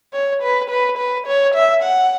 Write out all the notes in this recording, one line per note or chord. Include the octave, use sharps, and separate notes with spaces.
C#5
B4
B4
B4
C#5
E5
F#5